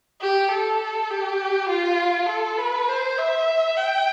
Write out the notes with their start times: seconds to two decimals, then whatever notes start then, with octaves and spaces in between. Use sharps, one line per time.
0.21 G4
0.51 A4
1.11 G4
1.69 F4
2.29 A4
2.58 B4
2.89 C5
3.18 E5
3.77 G5